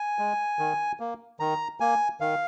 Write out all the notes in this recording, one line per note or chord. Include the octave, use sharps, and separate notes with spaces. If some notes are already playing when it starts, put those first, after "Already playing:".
Already playing: G#5
G#3
D#3
A#3
D#3 A#5
A#3 G#5
D#3 F5